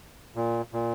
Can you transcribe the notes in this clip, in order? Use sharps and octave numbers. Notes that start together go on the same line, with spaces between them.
A#2
A#2